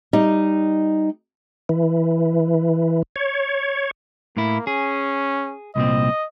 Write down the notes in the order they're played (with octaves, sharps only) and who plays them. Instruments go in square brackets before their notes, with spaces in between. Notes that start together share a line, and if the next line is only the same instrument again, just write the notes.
[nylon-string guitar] G3 D#4 D#5
[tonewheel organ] E3
C#5
[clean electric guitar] A2 E4 [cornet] A#3
[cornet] C#4 [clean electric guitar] G#4
[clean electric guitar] C2 A#2 C4 [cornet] D#5